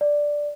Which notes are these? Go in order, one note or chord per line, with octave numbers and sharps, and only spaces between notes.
D5